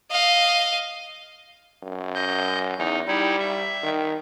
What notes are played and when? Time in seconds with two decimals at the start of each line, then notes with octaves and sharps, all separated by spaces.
0.11 D#5 F5
1.83 F#2
2.15 D#5 G6
2.78 E2 D#4
3.08 G3 D#4 E4
3.39 E5
3.83 D#3